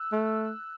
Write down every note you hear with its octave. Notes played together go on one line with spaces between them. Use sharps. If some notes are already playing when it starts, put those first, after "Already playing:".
Already playing: E6 F#6
A3